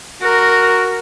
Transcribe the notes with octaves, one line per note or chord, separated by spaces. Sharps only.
F#4 A#4